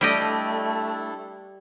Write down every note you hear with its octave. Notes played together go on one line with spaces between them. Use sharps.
G3 A3 D4 E4 G4 A4 D#5